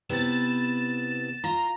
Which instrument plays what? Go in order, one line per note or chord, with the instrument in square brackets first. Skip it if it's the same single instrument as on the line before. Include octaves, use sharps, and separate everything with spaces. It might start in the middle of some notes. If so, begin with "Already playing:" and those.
[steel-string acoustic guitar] C3 B3 E4 [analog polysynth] A6 E7
[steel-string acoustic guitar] F4 [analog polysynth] A#5